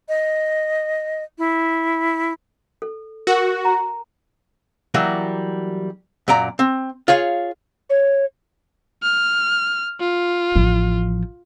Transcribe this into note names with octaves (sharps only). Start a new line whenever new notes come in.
D#5
E4
A4
F#4 A#4
A#5
E3 F#3 G3 A#3
F#2 A#2 D5 A#5
C4
F4 G#4 C#5 F5
C#5
F6
F4
A1 F3